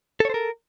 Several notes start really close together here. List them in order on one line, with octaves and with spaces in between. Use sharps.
A4 C#5 C5 A#4